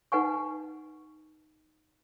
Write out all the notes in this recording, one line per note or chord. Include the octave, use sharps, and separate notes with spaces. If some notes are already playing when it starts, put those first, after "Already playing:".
D#4 B4 F#5 G#5 C#6